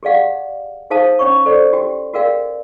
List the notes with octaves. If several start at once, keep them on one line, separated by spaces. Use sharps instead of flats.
G4 G#4 D5 F5 F#5
D#4 G#4 C5 F5 A5 D#6
C#4 C#5 C#6
A4 C5 D5
F#4 G4 G5
F#4 G#4 A#4 D5 F5 G5